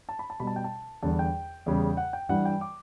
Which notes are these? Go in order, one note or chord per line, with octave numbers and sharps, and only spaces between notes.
A5
B5
A5
B2 G3 B5
A5
G5
A5
E2 D3 G3 A5
G5
E2 C#3 G3
F#5
G5
G2 E3 G3 F#5
G5
D6